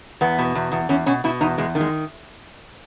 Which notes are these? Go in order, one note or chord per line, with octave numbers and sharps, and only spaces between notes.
E2 B3
B2
E2
E2
E2 C#4
B2 C#4
B2 E4
E2 D#4
E2 G#3
D#3
G#3